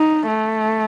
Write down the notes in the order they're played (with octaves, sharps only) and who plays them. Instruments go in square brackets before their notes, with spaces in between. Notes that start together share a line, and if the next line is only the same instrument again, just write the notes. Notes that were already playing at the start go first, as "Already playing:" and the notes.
Already playing: [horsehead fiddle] D#4
A3